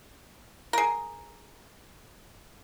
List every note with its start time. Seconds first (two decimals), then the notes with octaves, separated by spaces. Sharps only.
0.73 G#4 A#4